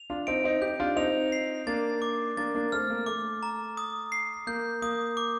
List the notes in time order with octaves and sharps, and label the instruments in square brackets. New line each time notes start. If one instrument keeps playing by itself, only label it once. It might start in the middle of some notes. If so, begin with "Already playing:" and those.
Already playing: [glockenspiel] F7
[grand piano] D4 F4
[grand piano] C4 D#4 [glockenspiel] D7
[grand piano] C4 D#4
[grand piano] D#4 G4 [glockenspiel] G6
[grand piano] D4 F4
[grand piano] C4 D#4 [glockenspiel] F7
[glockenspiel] C7
[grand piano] A#3 D4 [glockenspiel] A6
[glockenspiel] D6
[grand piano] A#3 D4 [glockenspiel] A6
[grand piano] A#3 D4
[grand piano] A3 C4 [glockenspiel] F6
[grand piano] A#3
[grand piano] A3 [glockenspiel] D6
[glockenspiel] A#5
D#6
C7
[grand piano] A#3 [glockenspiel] G6
[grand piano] A#3 [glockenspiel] D#6
[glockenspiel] D6